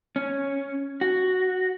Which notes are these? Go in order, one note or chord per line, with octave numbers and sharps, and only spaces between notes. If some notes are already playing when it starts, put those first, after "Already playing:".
C#4
F#4